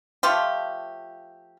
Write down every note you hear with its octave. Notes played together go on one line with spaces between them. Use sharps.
F3 A3 F4 G4